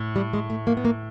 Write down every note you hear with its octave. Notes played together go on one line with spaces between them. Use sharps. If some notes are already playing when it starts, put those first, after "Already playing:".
Already playing: A2
G3
G#3
A3
A#3
B3
A#3